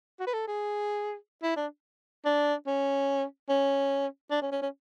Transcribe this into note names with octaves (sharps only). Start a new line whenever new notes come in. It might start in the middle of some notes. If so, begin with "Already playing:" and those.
F#4
B4
A4
G#4
E4
D4
D4
C#4
C#4
D4
C#4
C#4
C#4